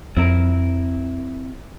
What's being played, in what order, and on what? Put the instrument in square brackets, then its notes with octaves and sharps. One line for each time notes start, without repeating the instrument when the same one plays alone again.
[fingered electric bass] F2 [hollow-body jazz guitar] C4 E4 A#4